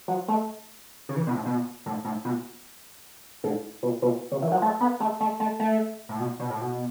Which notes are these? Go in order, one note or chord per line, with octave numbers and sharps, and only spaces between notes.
F#3
A3
C#3
E3
B2
A2
B2
A2
A2
B2
A2
B2
B2
C#3
E3
F#3
A3
B3
A3
A3
A3
A3
A2
B2
B2
A2
B2